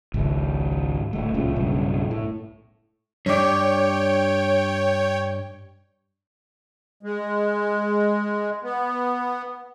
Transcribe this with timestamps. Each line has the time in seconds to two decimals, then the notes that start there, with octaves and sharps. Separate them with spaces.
0.14 G#1 C#2
1.13 D1 A3
1.34 E1 C#2 A#2 C#3
1.56 B1 G2 C#3
2.11 A2
3.26 G2 C#5 D5 G5
7.03 G#3
8.63 B3